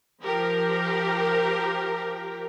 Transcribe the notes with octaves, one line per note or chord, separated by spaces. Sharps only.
F3 G4 A#4